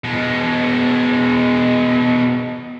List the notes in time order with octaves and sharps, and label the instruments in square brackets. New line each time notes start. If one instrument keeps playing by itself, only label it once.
[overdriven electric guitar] B2 G#3